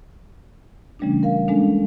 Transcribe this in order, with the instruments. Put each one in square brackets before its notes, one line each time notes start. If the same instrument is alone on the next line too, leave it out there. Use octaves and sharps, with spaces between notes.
[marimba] C#3 E3 G3 A3 C#4 D4
A#4 F5
G#3 A#3 C#4 D4 A4